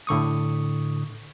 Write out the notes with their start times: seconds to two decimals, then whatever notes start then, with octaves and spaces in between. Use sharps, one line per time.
0.07 A2 D3 C#6 D#6